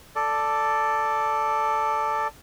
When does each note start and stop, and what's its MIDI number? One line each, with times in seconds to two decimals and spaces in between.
0.16 2.28 69
0.16 2.28 74